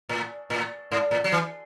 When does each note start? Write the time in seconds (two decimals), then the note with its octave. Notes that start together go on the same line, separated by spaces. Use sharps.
0.09 A2
0.50 A2
0.92 G#2
1.11 A2
1.24 F#3
1.32 E3